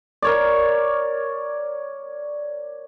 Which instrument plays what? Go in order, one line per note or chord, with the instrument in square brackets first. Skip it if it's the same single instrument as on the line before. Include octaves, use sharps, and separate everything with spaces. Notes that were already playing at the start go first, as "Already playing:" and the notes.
[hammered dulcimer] A#4 C#5 D5